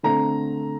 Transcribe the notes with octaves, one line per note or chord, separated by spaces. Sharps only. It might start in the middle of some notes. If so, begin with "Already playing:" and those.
D3 A3 C4 A#5